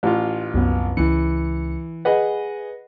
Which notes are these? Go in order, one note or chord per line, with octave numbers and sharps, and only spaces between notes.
A1 F4
C2 F#2 B3
C#2 E3 C#7
G#4 B4 D#5 F#5